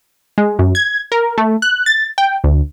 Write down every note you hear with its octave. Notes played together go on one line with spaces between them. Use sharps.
G#3
F#2
G#6
A#4
A3
F#6
A6
G5
D2